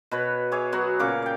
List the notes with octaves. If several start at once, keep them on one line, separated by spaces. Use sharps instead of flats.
B2 B4 C#5
G#4 C#5 E5 D6
F#3 B3 F#4
A#2 C#3 F5 D6
D5 G5